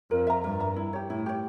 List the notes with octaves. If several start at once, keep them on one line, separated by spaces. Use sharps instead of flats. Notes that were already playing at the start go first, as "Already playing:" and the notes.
F2 A#4
E5 A#5
G2 A#4
E5 A#5
E4
G4 C#5
A2 E4
G4 C#5